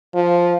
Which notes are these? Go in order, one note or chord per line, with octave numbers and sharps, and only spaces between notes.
F3